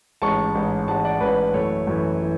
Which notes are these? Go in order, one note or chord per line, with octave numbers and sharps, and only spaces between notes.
A1 G#2 G#3 C#4 A5 C#6
A1 G#2 G#3 C#4
A1 G#2 G#3 C#4 F#5 A5
D5 F#5
A1 G#2 G#3 C#4 B4
F#2 E3 A3 C#5
F#2 E3 A3
E3